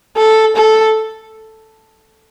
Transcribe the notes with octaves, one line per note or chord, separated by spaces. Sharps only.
A4
A4